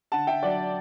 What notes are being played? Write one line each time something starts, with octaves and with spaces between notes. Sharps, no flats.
D3 F#5 A5
D3 E5 G5
F#3 D5 F#5